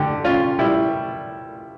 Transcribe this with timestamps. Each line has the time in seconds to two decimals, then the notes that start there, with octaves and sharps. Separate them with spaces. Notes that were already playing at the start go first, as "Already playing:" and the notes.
Already playing: D3 G4
0.25 C#4 F4
0.59 G3 E4